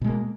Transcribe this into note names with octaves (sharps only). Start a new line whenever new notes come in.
B2 G#3 A#3